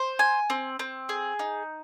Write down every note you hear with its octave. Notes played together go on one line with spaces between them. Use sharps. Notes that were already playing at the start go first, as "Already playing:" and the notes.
Already playing: C5
G#5
C4
C4
G#4
D#4